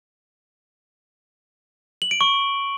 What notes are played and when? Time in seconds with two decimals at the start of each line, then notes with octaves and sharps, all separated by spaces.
2.02 F#7
2.11 D7
2.21 C#6